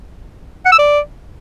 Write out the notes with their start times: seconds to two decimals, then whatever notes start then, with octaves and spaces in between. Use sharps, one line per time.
0.65 F#5
0.72 E6
0.79 D5